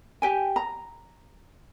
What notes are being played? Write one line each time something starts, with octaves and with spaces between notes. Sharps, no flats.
G4 G5 G#5
A#5